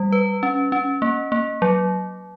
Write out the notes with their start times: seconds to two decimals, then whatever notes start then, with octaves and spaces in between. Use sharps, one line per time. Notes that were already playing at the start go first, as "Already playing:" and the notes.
Already playing: G3
0.12 B4
0.43 C#4
0.72 C#4
1.02 A#3
1.32 A#3
1.62 F#3